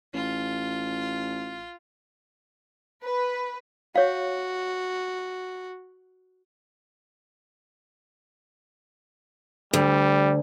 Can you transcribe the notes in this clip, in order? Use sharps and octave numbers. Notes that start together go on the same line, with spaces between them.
A1 F4
B4
F#4 C#5 F5
D2 G3